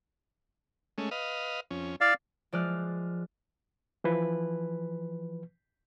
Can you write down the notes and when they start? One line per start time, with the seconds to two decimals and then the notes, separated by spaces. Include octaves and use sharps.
0.98 G#3 A3 C#4
1.11 B4 D#5 F5
1.71 F2 C#4
2.01 E4 D5 F5
2.52 F3 G#3 D5 E5 F6 F#6
4.04 E3 F3 B4